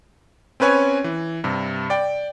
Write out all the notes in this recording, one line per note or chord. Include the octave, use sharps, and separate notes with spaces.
C4 C#4 B4 C#5 G#5
E3
G2 C3
D5 G5